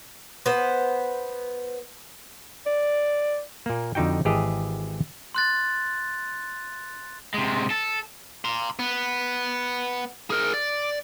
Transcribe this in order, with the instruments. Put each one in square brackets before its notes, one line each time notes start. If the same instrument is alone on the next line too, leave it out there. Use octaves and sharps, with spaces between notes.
[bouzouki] B3 C5
[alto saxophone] D5
[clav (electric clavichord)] A#2 A#3
F2 D3 D#4 F#4 G5
G#1 E3 G4 G#4 D#5 A5
[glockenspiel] C6 F#6 A6
[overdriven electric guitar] C3 G#3
A4
A#5 C6
B3
G#4 A#4
D5